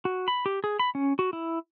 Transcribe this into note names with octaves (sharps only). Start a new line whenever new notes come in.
F#4
B5
G4
G#4
B5
C#4
F#4
E4